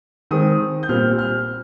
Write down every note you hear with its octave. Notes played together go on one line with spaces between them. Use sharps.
D#3 G#3 C4 D#6
G6
A#2 G3 C4 F6
F6